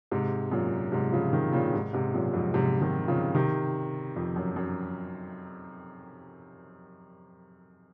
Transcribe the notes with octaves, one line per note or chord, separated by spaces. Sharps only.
G#2 C3
F#2 A#2
G#2 C3
C#3 F3
C3 D#3
A#2 C#3
G#2 C3
G#2 C3
F#2 A#2
F2 G#2
G#2 C3
C3 D#3
C#3 F3
C3 D#3
F2
F#2
F#2